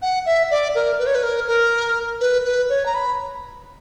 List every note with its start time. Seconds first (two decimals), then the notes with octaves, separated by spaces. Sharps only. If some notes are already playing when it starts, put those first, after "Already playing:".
0.02 F#5
0.26 E5
0.51 D5
0.75 A#4
0.99 B4
1.07 C#5
1.15 B4
1.23 A#4
1.47 A#4
2.21 B4
2.45 B4
2.69 C#5
2.86 A#5
2.94 B5